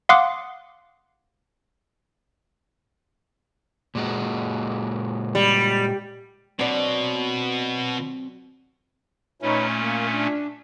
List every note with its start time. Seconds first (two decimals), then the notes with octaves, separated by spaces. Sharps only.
0.09 F5 F#5 C6 D6 D#6 F#6
3.95 A#2 G#3 F#4
5.35 G3
6.59 B2 F#3 C4 D4 B4 C5
9.42 A#2 A3 C#4 D#4 B4 C#5
9.79 A#3
10.11 D4